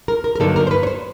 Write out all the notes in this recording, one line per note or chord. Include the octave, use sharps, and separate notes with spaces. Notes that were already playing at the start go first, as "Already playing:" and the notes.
A#4
A#4
A#4
G2 D3 F#3 A#3 D#4 A4
A#4
C5
B4
C#5
C5